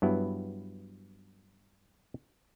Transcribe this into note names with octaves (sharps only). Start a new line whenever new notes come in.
G2 F#3 B3 E4